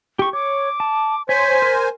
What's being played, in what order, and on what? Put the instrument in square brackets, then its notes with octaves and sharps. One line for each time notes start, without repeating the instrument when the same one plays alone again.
[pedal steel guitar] G4 C#6
[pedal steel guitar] C#5 [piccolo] D6
[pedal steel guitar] A5
[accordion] C5 G#5 [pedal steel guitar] C#5 [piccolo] B6
[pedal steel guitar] A#4